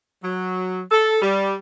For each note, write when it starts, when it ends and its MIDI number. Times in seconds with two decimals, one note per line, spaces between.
0.24 0.81 54
0.91 1.22 69
1.22 1.55 55